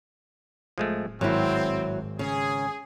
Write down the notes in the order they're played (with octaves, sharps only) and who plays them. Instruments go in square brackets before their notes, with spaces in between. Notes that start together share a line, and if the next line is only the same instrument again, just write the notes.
[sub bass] D1 [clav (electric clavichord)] F3 G#3 A3
[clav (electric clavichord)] G#1 [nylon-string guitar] F#3 E4 [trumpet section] C4
[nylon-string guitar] C#3 [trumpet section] G#4